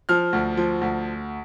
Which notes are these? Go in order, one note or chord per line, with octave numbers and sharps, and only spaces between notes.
F3 F6
D2
F3
D2